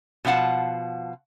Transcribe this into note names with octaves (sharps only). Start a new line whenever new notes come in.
B2 F3 F5 F#5 A5